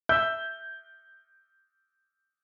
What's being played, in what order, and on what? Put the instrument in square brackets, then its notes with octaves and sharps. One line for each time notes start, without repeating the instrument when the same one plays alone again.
[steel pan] E5 [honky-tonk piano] G6